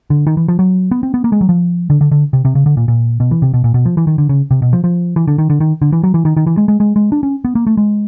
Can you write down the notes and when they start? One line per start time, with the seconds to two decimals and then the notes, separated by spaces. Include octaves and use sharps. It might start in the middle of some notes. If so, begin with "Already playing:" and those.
0.10 D3
0.27 D#3
0.37 E3
0.48 F3
0.59 F#3
0.91 B3
1.03 C4
1.14 B3
1.24 A#3
1.32 G#3
1.41 F#3
1.49 F3
1.90 D3
2.01 D3
2.11 D3
2.33 C3
2.45 C3
2.55 C#3
2.66 D3
2.77 A#2
2.88 A#2
3.20 B2
3.31 E3
3.42 C3
3.54 B2
3.64 A#2
3.74 B2
3.86 F3
3.97 E3
4.07 D#3
4.18 D3
4.29 C#3
4.51 C3
4.62 B2
4.73 F3
4.84 F3
5.16 E3
5.28 D3
5.38 D#3
5.50 D3
5.60 D#3
5.82 D3
5.92 E3
6.04 F#3
6.14 E3
6.25 D#3
6.37 D#3
6.47 E3
6.57 G#3
6.68 G#3
6.80 G#3
6.96 G#3
7.12 D4
7.23 C#4
7.45 B3
7.55 A#3
7.67 A3
7.77 G#3